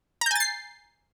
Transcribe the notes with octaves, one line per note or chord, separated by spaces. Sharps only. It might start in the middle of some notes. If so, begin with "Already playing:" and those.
G#5 A#5 G6 A6 C7